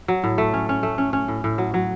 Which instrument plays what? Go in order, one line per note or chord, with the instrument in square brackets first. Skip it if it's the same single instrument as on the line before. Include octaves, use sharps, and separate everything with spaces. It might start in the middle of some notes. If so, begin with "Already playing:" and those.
[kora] F#3
A2
A3
C#4
C#4
A3
C#4
C#4
A2
A2
F#3
F#3